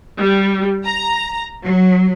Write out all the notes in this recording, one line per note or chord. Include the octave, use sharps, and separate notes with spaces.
G3
A#5
F#3